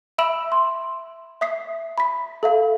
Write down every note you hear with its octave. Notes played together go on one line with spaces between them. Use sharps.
E5 B5 E6 D7 E7 F#7
C6
E5 D#6 B6 C7
B5 B6
A4 E5 F5